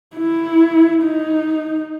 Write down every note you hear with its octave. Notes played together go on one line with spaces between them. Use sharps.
E4
D#4